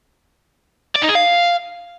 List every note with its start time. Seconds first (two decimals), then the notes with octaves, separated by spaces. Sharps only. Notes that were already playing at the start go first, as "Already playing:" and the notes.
0.96 D5
1.02 D#4
1.09 G#4
1.15 F5